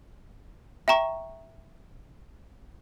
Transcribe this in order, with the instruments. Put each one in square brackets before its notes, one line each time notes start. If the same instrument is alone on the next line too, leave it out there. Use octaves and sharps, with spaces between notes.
[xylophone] E5 G5 A#5 C#6